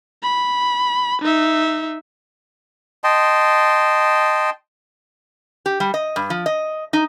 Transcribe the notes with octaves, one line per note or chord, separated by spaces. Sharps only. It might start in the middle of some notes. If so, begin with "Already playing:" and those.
B5
D#4 E5
D#5 G5 A5 C6
G4
G3
D#5
G2
F3
D#5
D#4